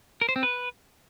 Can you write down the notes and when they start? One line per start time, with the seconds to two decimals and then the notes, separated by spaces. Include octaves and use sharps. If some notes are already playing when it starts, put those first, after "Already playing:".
0.21 A#4
0.29 C5
0.36 C4
0.43 B4